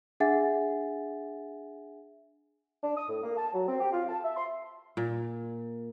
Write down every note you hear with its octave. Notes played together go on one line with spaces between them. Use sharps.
D4 G#4 E5 F#5 G#5 A6
D4
D#6
A2
A#3
A5
F#3
C4
G4
F4
A5
E5
C6
A#2